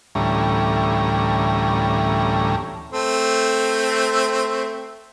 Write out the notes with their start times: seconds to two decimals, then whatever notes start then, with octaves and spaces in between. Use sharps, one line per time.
0.15 D2 A2 E3 G3 C#4 A#5
2.92 A3 C4